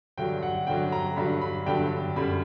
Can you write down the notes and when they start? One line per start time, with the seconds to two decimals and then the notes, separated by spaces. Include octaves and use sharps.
0.18 G2 D3 F#3 G5
0.42 F#5
0.67 G2 D3 F#3 G5
0.92 A#5
1.16 G2 D3 F#3 B5
1.41 B5
1.66 G2 D3 F#3 G5
2.16 F#2 D3 G3 B5